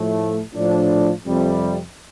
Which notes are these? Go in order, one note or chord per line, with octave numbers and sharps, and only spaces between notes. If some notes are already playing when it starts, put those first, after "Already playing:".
Already playing: A2 F3 A3
A2 F3 D4
F2 C3 G3